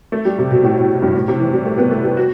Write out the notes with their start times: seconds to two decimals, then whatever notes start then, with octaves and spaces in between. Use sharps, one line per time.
0.12 A3
0.25 G3
0.38 C3
0.50 B2
0.63 A2
0.77 B2
1.02 G2
1.14 A2
1.28 C3
1.40 E3
1.54 G3
1.66 A3
1.78 B3
1.91 A3
2.04 G3
2.17 F#4